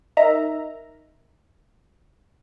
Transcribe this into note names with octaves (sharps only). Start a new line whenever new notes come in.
D#4 A#4 E5 A#5